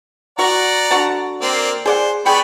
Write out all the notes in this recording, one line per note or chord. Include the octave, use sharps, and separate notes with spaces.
F#4 D5 F#5 A#5 C#6
D3 F#4 A5
A#3 C4 D5
G#4 C5 D5 F#5
B3 G#4 D5 G5 B5 C#6